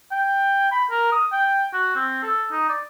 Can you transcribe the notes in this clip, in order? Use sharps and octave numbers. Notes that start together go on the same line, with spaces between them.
G5
B5
A#4
D#6
G5
F#4
C4
A4
D#4
D5